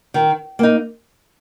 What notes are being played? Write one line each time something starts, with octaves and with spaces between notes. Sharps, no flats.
D#3
A#3 D#4